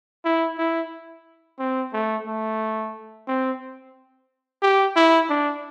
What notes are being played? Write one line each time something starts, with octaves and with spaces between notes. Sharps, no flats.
E4
E4
C4
A3
A3
C4
G4
E4
D4